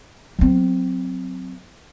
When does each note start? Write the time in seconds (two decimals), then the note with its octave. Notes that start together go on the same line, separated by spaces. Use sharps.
0.39 F#3 C4